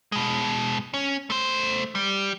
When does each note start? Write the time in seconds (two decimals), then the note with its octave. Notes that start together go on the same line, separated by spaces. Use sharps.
0.12 B2 G#3
0.94 C#4
1.30 A3 C5
1.95 G3